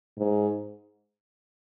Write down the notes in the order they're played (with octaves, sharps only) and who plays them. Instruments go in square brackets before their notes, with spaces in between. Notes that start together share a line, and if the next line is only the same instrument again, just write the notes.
[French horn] G#2